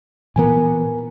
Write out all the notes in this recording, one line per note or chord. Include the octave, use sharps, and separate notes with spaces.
A#2 E3 B3 A#4 G#5